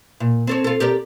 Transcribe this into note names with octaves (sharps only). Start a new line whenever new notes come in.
A#2
C4 A4 C#5
F4 A4
G4 A#4 D5